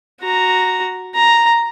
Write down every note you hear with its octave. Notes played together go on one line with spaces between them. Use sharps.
F#4 A#5
A#5